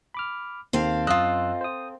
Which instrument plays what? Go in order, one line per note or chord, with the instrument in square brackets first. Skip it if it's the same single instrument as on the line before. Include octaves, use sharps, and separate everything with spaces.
[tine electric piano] B5 D6 F6
[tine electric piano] D#2 D#3 C7 [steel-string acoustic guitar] C4 A4 F5
[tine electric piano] F#2 E6 F#6 [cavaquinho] F4 D#5
[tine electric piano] C5 D#6